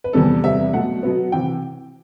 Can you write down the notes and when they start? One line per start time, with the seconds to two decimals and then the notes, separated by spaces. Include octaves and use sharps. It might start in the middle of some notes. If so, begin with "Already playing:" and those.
0.04 B4
0.13 E2 C3 E3 G3 B3 A4
0.43 E2 C3 G3 B3 E5
0.73 B2 F#3 A3 F#5
1.03 B2 F#3 B3
1.32 C3 E3 G5